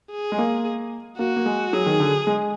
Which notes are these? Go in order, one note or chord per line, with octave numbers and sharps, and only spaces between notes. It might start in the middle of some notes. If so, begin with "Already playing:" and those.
G#4
G#3
A#3
A#3 F#4
A#3
G#3
F#3 G#4
D#3
D3
G#3